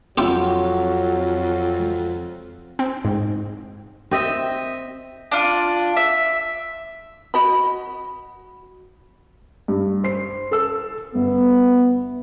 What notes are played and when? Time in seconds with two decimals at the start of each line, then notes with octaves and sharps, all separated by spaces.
0.18 F2 F#3 E4 F4 G4
2.79 C4
3.05 G#2
4.11 C4 D#5 E5
5.32 D4 F4
5.96 E5
7.34 F#4 D#5 B5
9.68 G2
10.04 C5 C7
10.51 A4 E6
11.15 G1 B3